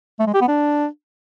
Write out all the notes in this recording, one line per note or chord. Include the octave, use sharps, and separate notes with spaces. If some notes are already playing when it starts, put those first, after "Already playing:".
A3
G#3
G4
B3
D4